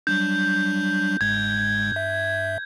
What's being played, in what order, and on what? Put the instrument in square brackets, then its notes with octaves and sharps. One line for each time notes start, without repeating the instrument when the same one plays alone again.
[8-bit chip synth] F#3 G3 D4 [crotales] G6
[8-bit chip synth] G1 G#2 G#3 [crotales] G#6
[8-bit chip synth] G2 E5